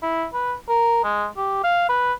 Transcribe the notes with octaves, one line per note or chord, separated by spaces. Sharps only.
E4
B4
A#4
G#3
G4
F5
B4